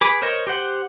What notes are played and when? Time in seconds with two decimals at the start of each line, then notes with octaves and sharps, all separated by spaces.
0.01 G#4 B4 D6
0.22 A#4 C5 C#5 D#5
0.47 G4 C5 F#5